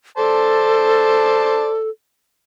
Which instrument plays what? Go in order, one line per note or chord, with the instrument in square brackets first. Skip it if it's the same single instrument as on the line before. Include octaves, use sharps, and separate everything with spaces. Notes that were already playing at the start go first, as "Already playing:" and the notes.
[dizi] A4 [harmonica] C5 D5 A5